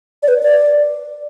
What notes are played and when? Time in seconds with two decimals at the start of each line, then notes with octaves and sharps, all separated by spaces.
0.23 D5
0.28 B4
0.43 D5